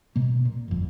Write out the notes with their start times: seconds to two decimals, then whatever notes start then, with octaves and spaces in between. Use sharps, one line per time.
0.16 B2 A#3
0.45 A#2
0.68 G1 F2